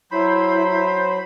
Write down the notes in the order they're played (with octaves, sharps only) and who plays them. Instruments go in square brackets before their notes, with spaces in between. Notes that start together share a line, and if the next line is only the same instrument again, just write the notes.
[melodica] F#3 B5 [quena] E4 [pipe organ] C5